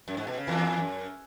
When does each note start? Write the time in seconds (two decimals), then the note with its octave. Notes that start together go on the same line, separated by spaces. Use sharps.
0.08 F#2
0.17 G#2
0.27 B2
0.38 C#3
0.47 E2 E3
0.78 F#2